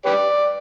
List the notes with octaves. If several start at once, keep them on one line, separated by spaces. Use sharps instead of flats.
G4 B4 D5